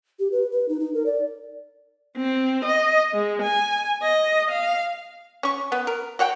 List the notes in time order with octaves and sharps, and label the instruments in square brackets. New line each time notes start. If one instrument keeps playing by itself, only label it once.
[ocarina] G4
B4
B4
D#4
D#4
A#4
D5
[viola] C4
D#5
G#3
G#5
D#5
F5
[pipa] C#4 C#6
B3
A#4
F#4 C#5 F#5 G5